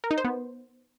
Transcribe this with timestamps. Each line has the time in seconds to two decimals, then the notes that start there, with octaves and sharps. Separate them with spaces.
0.04 A#4
0.11 D#4
0.18 C5
0.25 B3